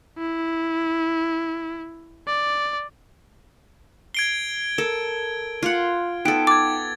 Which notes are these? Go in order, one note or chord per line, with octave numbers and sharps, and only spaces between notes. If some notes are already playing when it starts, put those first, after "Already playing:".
E4
D5
G#6 C7 D7 G7
A4 A#4
F4 F#5
B3 D#4 A4 G5 D7
D6 G#6 A6